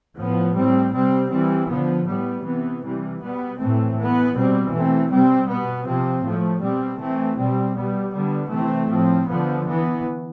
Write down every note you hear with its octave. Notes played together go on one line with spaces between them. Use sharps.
A2 F3 B3
A2 G3 C4
C3 G3 C4
E3 G3 C4
D3 F3 B3
A2 G3 B3
C3 E3 B3
C3 E3 G3
B2 G3 B3
A2 E3 A3 C4
E3 B3
B2 G3 C4
E3 A3 C4
C3 G3 C4
B2 B3
C3 F3 C4
A2 F3 A3
B2 G3 C4
E3 A3 C4
B2 G3 C4
B2 G3 B3
D3 G3 B3
C3 E3 A3 C4
A2 F3 C4
D3 F3 B3
E3 B3